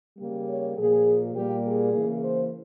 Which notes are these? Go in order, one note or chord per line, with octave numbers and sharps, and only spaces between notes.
C#3 G3 A#3
C#5
A#2 F3 A#3 G#4
A#2 G3 A#3 G4
G#4
C#3 E3 A#3
C5